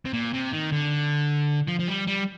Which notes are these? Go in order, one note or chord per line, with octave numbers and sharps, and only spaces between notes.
C3
A#2
C3
D#3
D3
F3
F3
G3
G3